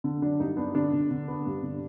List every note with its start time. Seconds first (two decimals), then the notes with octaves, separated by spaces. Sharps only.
0.04 D3
0.22 F#3 D4
0.40 G2 D#4
0.57 B3 D4
0.75 D3 D4
0.93 D3
1.11 D3
1.28 B3
1.46 G2
1.63 D3